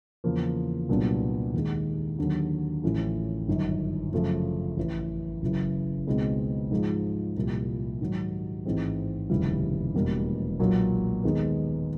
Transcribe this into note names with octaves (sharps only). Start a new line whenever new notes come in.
E2 C#3 F3 A#3
C2 A#2 F#3 B3 D4
D#2 D#3 G#3
D#2 D3 F#3
A1 A2 F3 A3 C#4
G1 F#2 D#3
F#2 C#3 F3 A3
A1 A2 E3
F#1 F#2 C#3 E3
C#2 B2 G#3 C4 D#4
G#2 F3 G#3
C2 A#2 F3
G#2 D#3 F#3
A1 G#2 E3 G#3 C4
F1 D#2 C#3 E3 G3
E1 E2 B2 G3 A#3
B1 A#2 F#3 A#3
D#2 D#3 G#3 B3